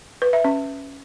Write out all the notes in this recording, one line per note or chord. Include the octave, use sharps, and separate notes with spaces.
B4
E5
C#4